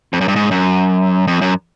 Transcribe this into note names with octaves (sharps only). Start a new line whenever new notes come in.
F2
F#2
G2
G#2
F#2
F2
F#2